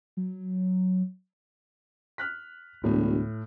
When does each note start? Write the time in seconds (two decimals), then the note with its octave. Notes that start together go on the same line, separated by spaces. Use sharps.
0.17 F#3
2.18 F6 F#6 B6
2.84 E1 D2 A2